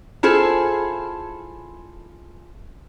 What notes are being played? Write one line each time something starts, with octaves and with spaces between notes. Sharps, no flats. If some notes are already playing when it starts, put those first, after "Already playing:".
E4 F4 G#4 A4 C5